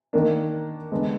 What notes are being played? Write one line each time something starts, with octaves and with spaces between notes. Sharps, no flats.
D#3 A#3 D4
D3 G#3 B3